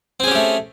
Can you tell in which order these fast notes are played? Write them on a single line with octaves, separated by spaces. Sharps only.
C4 G#4 C#4 G4 A3